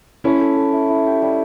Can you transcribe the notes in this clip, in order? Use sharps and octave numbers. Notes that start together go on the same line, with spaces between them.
C#4 E4 A4
A3
A3
E4
E4
G4
G3